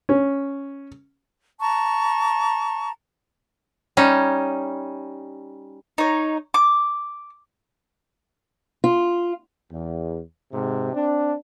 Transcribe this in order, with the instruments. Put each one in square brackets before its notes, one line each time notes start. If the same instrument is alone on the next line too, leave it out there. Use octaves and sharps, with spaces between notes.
[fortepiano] C#4
[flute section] A5 A#5 C#6
[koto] G3 C#4 D#4
[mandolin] D#4 C#5
D6
[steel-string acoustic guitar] F4
[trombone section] E2
G#2 C3
C4 D4